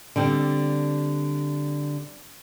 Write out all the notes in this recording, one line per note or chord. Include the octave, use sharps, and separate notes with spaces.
D3 G3 C4